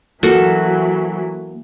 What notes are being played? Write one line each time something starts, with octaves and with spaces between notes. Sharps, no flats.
E3 F#3 A#3 F#4 A4